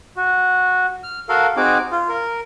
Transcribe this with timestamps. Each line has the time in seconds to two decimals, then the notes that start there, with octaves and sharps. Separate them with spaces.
0.17 F#4
1.03 F6
1.29 F#4 A4 A#4 F5
1.57 C4 D#4 F#4 G#4 D6
1.91 F4
2.09 A#4